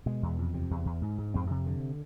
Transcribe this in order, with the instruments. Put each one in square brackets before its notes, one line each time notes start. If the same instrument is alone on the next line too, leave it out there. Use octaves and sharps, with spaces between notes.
[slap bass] B2 G#3
E2
F2
C3
E2
E2
G#2
G#2
F2 C4
C3
D3